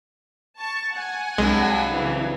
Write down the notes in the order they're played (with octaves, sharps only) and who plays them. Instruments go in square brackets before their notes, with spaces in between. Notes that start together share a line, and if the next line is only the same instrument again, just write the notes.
[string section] A5 C#6
F#5 G#5
[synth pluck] C2 G#3 [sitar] G2 F#3
[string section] C#3 E3 C4